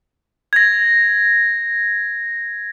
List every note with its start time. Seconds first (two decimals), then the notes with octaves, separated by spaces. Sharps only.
0.53 G#6 A#6